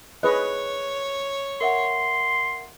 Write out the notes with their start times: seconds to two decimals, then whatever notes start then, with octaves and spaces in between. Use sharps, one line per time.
0.23 G#4 B4 C#5 D#5 F#6
1.61 A#4 E5 F#5 C6